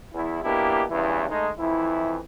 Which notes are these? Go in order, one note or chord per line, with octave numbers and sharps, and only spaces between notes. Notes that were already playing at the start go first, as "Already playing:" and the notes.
E2 E4
B2 A#3 D4 E4 G4
E2 G2 C#3 E3
G#3 A3 D#4
F2 E3 E4